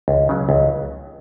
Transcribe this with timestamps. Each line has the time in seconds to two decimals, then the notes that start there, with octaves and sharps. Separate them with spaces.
0.08 C#2
0.29 C#3 F#3
0.49 C#2